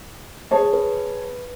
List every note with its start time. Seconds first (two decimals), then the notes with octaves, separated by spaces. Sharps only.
0.51 G#4 C#5 A5
0.73 B4